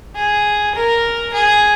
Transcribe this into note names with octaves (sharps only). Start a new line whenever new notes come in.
G#4
A#4
G#4